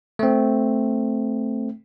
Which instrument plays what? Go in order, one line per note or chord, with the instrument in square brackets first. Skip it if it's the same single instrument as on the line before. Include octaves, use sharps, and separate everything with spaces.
[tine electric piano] A3 C4